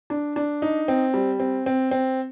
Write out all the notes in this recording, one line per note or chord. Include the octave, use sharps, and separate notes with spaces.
D4
D4
D#4
C4
G3
C4
C4
C4